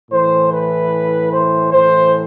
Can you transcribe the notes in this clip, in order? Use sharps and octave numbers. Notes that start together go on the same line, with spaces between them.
A2 E3 C5
B4
C5
A2 E3 C5